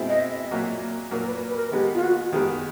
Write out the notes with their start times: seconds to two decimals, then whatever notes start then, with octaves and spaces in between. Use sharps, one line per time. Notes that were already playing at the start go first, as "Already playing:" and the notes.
Already playing: B2 G#3 C4 E4
0.09 D#5
0.20 E5
0.51 A#2 F#3 A#3
1.11 A#2 F#3 A#3 A#4
1.27 B4
1.49 B4
1.57 A#4
1.72 D#3 G#3 B3 G4
1.94 F4
2.03 F#4
2.32 D#3 G#3 B3 G4